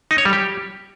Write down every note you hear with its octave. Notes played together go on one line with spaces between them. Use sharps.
D#4
C#5
G3
G4